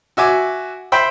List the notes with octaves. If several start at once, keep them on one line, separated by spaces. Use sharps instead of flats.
F#4 E5 G#5 D6
C5 E5 G5 B5